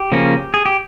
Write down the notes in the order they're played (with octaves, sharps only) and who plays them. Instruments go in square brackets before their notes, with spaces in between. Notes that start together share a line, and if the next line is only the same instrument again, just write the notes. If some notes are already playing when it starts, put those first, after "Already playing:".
Already playing: [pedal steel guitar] G4
C#3 F3 A#3 C#4
G#4
G4